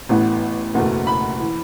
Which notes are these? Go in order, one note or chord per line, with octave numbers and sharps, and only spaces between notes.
A1 A2 E3 B3
F#1 E2 B2 A3
B5
E3